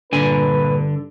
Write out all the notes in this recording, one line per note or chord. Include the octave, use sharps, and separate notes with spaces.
G2 A#2 D3 D4 B4 G#5